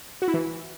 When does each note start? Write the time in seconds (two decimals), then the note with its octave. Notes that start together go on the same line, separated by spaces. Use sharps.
0.22 F#4
0.28 E4
0.34 E3